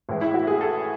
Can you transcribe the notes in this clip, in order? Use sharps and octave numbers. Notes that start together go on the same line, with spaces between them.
A1 A2 E3 G#3
E4
F#4
G#4
A4